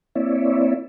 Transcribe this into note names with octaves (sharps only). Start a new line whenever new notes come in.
A#3 C4 E4 C#5 D5 E5